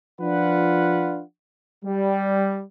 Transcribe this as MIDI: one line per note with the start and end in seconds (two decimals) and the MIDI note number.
0.21 1.22 53
0.21 1.22 62
0.21 1.22 65
0.21 1.22 71
0.21 1.22 78
1.84 2.62 55